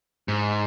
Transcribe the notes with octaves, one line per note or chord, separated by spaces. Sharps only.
G#2